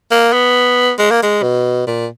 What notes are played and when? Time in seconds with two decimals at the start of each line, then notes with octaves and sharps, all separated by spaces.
0.11 A#3
0.33 B3
0.98 G#3
1.11 A#3
1.22 G#3
1.43 B2
1.87 A#2